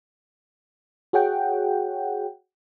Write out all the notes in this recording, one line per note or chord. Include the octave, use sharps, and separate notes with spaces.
F#4 G#4 C#5 F#5 G5